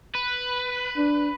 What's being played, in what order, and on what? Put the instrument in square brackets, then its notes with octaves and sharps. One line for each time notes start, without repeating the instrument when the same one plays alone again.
[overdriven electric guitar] B4
[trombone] D4